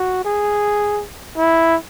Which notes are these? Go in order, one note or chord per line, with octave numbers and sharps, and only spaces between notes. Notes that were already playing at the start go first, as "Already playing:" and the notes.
Already playing: F#4
G#4
E4